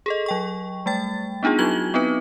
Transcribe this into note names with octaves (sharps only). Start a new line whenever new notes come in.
G#4 A4 D#5
F#3 G5 C#6
G3 A3 G5 A6
B3 D4 D#4 F4 G#4
F#3 E4 F#4 G#6 F#7 G7
B3 C4 D#4 B4